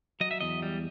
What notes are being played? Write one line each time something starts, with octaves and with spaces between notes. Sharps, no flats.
F#3 D#5
E5
E2 D#5
G3